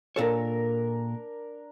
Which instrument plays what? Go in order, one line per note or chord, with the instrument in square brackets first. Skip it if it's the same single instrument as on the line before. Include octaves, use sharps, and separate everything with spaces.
[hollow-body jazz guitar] A#2 A4 C#5 [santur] D4 A#4